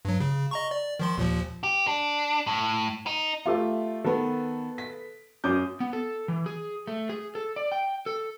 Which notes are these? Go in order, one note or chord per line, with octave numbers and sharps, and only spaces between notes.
G2 F#3
C#3
D#5 A#5 C#6
D5
D#3 F3 C6
D#2 A#2 F3
G4
D4
A2
D#4
A3 F4 G4 E5
D#3 B3 A4 B4
B6
F#2 C#4 D6 D#6 G6
B3
A4
E3
G#4
A3
G#4
A4
D5
G5
A4